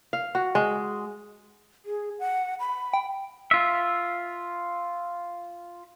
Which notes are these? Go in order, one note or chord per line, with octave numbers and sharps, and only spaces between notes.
F5
F#4
G#3
G#4
F#5
B5
G5
F4 E5